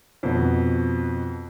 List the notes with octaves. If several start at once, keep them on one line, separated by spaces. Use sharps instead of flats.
F2 B2